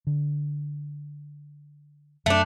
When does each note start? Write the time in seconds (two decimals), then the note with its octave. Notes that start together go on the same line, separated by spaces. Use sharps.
0.07 D3
2.26 F#2 A3 D4